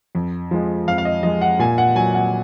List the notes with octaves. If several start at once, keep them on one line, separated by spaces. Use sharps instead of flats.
F2
F3 G#3
F2 F5
F5
D#5
F3 G#3 D#5
F#5
A#2 G#5
F#5
F#3 G#5
F#5